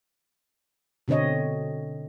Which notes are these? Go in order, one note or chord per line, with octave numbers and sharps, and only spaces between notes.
B2 D3 C4 C#5 D#5